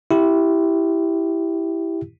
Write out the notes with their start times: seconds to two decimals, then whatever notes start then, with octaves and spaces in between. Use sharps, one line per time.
0.11 E4 G4